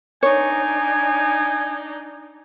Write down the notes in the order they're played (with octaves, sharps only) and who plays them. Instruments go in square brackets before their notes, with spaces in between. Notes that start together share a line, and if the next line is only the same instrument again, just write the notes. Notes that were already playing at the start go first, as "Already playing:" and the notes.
[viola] D4 D#4 [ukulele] C#5 [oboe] G#5